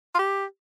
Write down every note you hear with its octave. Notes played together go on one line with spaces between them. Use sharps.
F4
G4